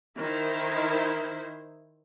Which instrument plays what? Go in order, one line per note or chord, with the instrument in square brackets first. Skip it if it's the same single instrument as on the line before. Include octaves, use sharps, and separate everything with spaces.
[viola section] D#3 E4 C5